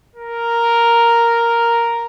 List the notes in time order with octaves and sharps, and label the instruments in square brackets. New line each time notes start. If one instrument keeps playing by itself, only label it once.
[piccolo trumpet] A#4